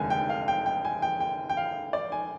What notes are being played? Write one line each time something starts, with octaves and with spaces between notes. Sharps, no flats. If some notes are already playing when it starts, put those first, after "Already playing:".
Already playing: F1 D#2 D3 G#3 G#5
G5
F5
G5
G5
G#5
G5
G5
G5
F5
D5
G#5